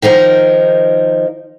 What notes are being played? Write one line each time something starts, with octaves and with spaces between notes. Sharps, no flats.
D#3 F3 D#4 A#4